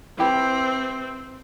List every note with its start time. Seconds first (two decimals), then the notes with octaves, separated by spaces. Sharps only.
0.18 C4 E4 G4 B4